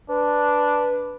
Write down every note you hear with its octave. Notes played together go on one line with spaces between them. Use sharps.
D4 B4